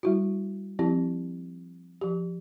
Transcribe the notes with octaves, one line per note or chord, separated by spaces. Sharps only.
G3 E4 F#4
F3 C4 E4 G4
F3 G4